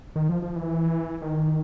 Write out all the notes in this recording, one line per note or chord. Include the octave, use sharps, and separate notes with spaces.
D#3
F3
F3
E3
D#3